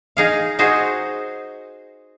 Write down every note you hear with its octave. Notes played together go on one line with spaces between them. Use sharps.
D#4 G#4 F5
D#4 F#4 G#4 C5